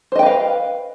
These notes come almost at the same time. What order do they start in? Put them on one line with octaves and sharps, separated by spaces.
C5 D#5 G5 B4 F5